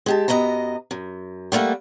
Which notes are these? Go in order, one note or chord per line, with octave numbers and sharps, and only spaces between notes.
G#3 G4 A5
F#2 G#3 B3 D#5 A#5
F#2
G3 A3 A#3 F#5